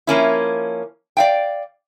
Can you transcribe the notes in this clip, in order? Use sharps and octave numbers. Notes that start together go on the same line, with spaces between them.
F3 A#3 C#4 E4
D5 F5 G5